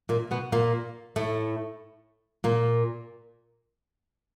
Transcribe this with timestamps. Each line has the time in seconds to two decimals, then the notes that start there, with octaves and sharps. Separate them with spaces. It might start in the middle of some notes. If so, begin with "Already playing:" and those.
0.09 A#2 A#3
0.31 B2 B3
0.52 A#2 A#3
1.16 A2 A3
2.44 A#2 A#3